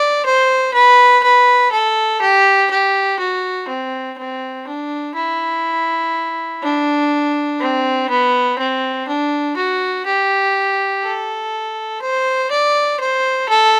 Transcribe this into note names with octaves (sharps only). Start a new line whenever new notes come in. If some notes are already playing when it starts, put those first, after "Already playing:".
Already playing: D5
C5
B4
B4
A4
G4
G4
F#4
C4
C4
D4
E4
D4
C4
B3
C4
D4
F#4
G4
A4
C5
D5
C5
A4